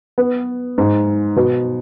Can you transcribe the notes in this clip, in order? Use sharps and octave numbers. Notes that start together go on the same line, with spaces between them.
B3
G#2
B2